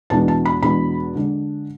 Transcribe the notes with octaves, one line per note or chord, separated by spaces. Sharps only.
E2 B2 G#3 B3 D4 A5
A5
B5
E2 B2 G#3 B3 D4 B5
D3 G#3 D4